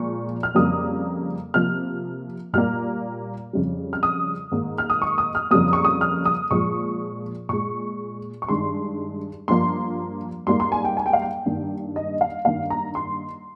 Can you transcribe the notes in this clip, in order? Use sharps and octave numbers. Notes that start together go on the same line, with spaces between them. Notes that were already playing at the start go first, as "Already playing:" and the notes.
Already playing: A#2 F3 G#3 C#6
F6
F2 C#3 G3 A#3 D#6
C3 F3 A#3 F6
A#2 G3 A#3 F6
F2 C#3 G3
F6
D#6
G#2 D#3 A#3
F6
D#6
C#6
D#6
F6
F2 C#3 G3 A#3 D#6
C#6
D#6
F6
D#6
A#2 F3 G#3 C#6
A#2 G#3 C#6
C#6
G2 D#3 G#3 C6
G2 F3 A#3 C6
G#2 G3 A#3 C6
C6
G#5
G5
G#5
G5
F5
G5
G2 D#3 A#3
D#5
F5
G2 D#3 A#3 F5
A#5
C6